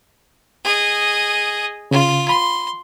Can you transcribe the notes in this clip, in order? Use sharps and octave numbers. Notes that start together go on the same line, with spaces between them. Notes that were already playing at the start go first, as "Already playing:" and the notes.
G#4 D#5
C#3 F4
B5 C6